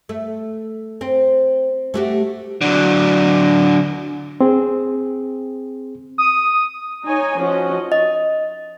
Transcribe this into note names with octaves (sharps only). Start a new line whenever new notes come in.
A3
C4
A3 F#4 G4
D3 F#3
C4 G#4
D#6
D#4 C#5 G#5
F3 C#4 F#4 D#5
D#5